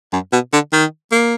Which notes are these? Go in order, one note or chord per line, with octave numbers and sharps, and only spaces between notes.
F#2
B2
D3
D#3
A#3